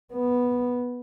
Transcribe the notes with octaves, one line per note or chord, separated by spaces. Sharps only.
B3